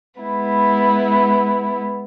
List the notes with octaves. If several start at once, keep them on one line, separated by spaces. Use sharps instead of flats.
G#3 B3 E4